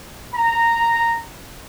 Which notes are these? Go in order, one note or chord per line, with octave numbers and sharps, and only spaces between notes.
A#5